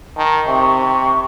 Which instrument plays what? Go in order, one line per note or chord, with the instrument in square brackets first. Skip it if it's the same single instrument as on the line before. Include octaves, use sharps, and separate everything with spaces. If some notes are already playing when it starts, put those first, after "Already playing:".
[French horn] D#3 [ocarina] A5
[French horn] C3 [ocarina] C#6